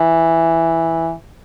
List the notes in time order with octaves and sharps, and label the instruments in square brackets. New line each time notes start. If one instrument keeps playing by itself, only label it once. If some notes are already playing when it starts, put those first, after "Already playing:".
Already playing: [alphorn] E3